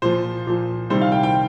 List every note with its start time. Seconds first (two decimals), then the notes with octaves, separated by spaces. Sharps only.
0.02 A#2 F3 C5
0.47 A#2 F3
0.90 C3 D#3 G3 C5
1.01 F5
1.12 G5
1.23 G5